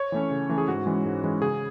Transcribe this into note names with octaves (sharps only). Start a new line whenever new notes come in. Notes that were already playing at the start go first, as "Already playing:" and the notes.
Already playing: C#5
E3 A3 C#4
C#3
E3 A3 C#4
G#4
G#2 F#4
E3 G#3 C#4
G#2
E3 G#3 C#4
C#3 G#4